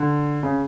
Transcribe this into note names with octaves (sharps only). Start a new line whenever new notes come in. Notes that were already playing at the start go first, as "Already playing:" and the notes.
Already playing: D3
C#3